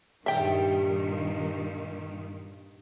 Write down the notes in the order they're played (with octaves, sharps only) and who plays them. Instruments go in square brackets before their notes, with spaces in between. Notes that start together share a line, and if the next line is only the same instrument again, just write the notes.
[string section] G2 A#2 D#3 [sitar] G3 [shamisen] E5 G5